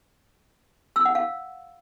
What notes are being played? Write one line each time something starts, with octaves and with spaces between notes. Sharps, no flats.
E6
F#5
F5